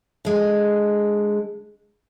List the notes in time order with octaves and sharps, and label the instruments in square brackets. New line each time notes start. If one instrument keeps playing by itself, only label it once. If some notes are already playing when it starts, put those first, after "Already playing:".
[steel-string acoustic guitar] D3 G#3